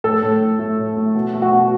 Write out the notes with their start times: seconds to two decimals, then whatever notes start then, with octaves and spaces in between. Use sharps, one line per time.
0.04 A2 A4
0.23 A2
0.41 A2
0.59 A3
0.78 A2
0.96 A3
1.15 B2
1.34 A3
1.42 F#4
1.52 B2